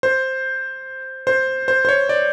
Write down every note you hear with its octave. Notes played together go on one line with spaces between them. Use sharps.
C5
C5
C5
C5
C#5
D5